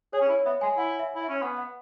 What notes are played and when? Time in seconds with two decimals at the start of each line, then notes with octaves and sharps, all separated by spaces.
0.13 G#4 C#5
0.21 C#4
0.29 E4 C#5
0.46 B3 E5
0.61 G#3 G#5
0.77 E4 F#5
0.99 E5
1.15 E4
1.21 E5
1.29 C#4
1.42 B3 F#5
1.58 F#5